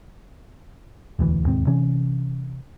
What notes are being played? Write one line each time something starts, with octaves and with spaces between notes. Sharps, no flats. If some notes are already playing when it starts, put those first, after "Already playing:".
E1 D2 E3
E1 D#2 G#2 C4
C3 E3 C#4